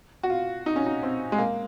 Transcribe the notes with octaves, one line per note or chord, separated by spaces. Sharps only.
F#4
F4
D#4
C#4
D#4
C4
G#3
A#3